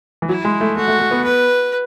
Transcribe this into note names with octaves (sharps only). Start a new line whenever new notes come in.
E3
F#3 E4
G#3
A3
A3 F#4
A3
A3
B3
B4